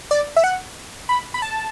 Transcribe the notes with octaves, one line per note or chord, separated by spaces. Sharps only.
D5
E5
F#5
B5
B5
A5